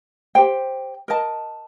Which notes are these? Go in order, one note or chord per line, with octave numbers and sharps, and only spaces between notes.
G4 C5 G5
A#4 D#5 A5